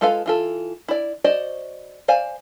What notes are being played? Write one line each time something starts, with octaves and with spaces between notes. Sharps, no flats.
G#3 F4 A4 B4 F5
E3 F4 A4
E4 D5
F#4 C5 D5 D#5
C5 D5 F5 G#5